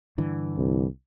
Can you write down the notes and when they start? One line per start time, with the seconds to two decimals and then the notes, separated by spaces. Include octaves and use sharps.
0.18 G2 D3 E3
0.57 C2